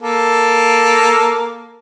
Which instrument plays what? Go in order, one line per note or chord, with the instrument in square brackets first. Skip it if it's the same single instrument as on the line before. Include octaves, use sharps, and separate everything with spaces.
[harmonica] A#3 A4